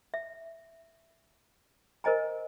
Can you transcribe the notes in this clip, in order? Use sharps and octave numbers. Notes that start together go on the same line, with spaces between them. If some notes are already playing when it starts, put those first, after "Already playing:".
E5
A#4 C5 D#5 G#5 A#5